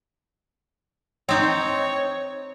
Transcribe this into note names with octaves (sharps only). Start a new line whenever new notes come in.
C4 D#4 C#5